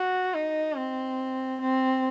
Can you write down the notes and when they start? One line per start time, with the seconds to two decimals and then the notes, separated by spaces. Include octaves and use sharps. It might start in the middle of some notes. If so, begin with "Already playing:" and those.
Already playing: F#4
0.34 D#4
0.77 C4
1.61 C4